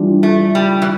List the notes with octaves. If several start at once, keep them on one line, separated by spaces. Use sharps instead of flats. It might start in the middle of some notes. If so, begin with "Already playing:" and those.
Already playing: E3 G3 D4 F4
A3
G3
E3